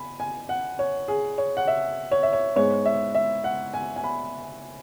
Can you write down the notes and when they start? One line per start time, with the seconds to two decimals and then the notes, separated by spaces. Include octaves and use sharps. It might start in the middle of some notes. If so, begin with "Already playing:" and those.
Already playing: G#5 B5
0.20 G#5
0.49 F#5
0.79 C#5
1.08 G#4
1.38 C#5
1.57 F#5
1.67 E5
2.11 C#5
2.23 E5
2.33 C#5
2.56 G#2 G#3 B3 C#5
2.85 E5
3.15 E5
3.44 F#5
3.74 G#5
3.96 G#5
4.04 B5